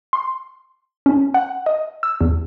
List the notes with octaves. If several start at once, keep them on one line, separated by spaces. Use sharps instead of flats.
C6
C#4
F#5
D#5
E6
E2